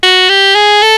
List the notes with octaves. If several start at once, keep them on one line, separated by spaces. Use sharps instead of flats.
F#4
G4
G#4
A4